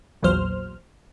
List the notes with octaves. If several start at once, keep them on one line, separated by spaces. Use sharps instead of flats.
A#1 E2 A#2 F#3 C5 F6